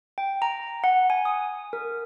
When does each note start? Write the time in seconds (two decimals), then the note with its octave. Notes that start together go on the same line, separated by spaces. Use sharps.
0.18 G5
0.42 A#5
0.84 F#5
1.10 G#5
1.25 D#6
1.73 A#4